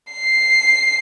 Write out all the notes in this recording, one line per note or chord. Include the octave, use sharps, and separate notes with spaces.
C7